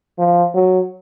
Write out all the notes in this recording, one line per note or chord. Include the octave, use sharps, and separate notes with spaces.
F3
F#3